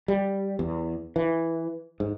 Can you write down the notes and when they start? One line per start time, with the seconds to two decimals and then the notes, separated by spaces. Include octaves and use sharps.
0.08 G3
0.59 E2
1.16 E3
2.00 G#2